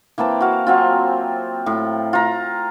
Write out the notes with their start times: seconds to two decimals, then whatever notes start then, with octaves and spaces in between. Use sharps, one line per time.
0.18 E3 A#3 C4 A5
0.41 F#4 F5
0.66 F#3 C4 F4
1.66 A2
2.13 F4 A#5